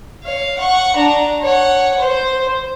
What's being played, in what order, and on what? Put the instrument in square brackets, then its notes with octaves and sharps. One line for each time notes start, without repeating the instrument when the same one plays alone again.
[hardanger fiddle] C#5 F5
F#5 C#6
D4 A#5
C#5 F#5
C5